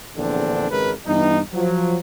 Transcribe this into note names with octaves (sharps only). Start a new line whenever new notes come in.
A#1 E2 D3 C4 D4
G#1 C#3 G#3 A#4 B4
G2 E3 B3 D#4
F3 F#3